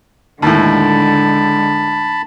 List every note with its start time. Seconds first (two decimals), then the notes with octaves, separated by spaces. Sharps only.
0.42 D#2 A2 D3 G#3 A5 B5